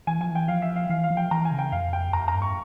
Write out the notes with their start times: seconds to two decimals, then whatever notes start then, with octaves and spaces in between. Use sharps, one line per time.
0.07 E3 G#5
0.19 F3 G#5
0.31 E3 G5
0.48 F3 F5
0.62 E5
0.76 F5
0.89 E3 F5
1.03 F5
1.10 F3
1.17 G5
1.31 E3 A#5
1.45 G#5
1.52 C#3
1.59 G5
1.72 F2 F5
1.93 G5
2.13 F2 A#5
2.28 A#5
2.35 G2
2.42 C#6